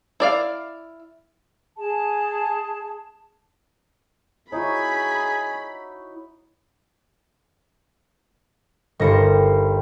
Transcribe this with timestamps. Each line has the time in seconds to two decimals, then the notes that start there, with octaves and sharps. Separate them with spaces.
0.20 E4 D5 F5
1.77 G#4 A5
4.52 D#4 E4 F#4 G#4 C#5 B5
9.00 G1 D#3 G3 C5 A#6 C#7